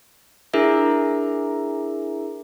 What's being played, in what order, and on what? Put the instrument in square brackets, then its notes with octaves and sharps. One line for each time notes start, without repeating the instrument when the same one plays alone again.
[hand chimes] D4 E4 G#4 A#4 E5